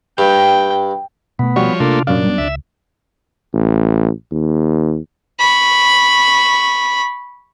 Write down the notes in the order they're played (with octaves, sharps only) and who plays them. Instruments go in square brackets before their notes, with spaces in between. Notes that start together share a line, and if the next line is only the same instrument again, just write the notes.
[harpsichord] G2 [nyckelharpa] G5
[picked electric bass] B2 A3 [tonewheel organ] B3
[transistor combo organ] F3 C#5 [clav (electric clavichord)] G3 F#4
[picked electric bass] C3 [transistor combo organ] A3 A#3 [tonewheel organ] D4 F4
[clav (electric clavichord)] F#2 F5 [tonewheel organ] A#2 [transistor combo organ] D4
[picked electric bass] G3 B3
[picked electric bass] C#2 [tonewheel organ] E5
[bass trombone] A1
D#2
[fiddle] B5 C#6